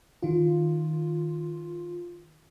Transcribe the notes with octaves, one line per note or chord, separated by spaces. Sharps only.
D#3 F4